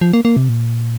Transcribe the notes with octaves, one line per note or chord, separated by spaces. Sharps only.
F3
A#3
A#3
C3
A#2